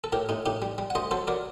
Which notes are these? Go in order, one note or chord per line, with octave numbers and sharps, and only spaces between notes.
A4
A2 G4 A#4
A2 D#4
A2 D#4 G4
G3
G3
F#5
D2 C5 D#5
F#3 A4 C5
F#3 A#4 D5